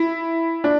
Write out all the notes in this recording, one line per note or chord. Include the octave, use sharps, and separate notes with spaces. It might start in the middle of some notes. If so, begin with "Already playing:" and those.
Already playing: E4
D4